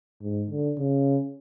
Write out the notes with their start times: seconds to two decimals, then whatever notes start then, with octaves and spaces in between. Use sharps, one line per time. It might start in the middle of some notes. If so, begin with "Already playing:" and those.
0.22 G#2
0.50 D3
0.78 C#3